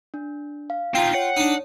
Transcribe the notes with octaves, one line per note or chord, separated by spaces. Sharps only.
D4
F5
C4 D#4 F4 G5 C7
C#5 F#5
D4 D#4